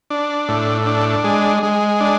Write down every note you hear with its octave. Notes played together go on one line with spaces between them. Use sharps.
D4
A2
D4
G#3
G#3
D4